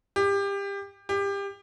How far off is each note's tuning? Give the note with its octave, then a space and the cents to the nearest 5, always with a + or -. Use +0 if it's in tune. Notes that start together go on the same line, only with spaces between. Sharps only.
G4 +25
G4 +25